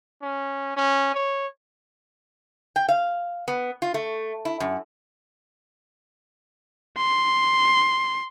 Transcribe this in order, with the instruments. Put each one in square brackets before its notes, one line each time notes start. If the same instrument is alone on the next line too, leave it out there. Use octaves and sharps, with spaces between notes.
[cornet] C#4
C#4
C#5
[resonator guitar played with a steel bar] G5
F5
B3
F4
A3
E4
F#2
[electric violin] C6